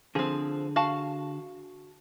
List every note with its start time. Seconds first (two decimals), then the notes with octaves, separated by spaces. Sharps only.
0.15 D3 F3 C4 G#4
0.76 F#4 F5 A5